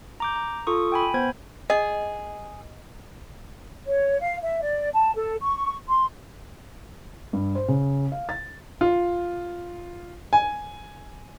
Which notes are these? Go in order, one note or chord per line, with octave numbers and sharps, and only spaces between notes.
A#5 D6 G6
A#5
F4 A4 C#6 D#6
G5 G#5 B5
B3 C5 G#6
G#4 D#5
C#5
F5
E5
D5
A5
A4
C#6
C6
G2
C5
C#3
F5
A6
F4
G#5